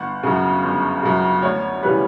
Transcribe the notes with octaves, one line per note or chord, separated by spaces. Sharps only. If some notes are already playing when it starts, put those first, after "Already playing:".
Already playing: G1 F#5
F#2 C#3
G1
F#2 C#3
D2 C#5
C#3 E3 G3 B4